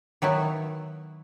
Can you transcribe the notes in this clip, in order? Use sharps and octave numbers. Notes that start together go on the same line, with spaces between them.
D#3 F#3 B3 E4